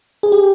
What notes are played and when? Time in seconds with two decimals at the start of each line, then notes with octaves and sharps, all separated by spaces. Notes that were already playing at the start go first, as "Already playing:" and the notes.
0.23 G#4
0.32 G4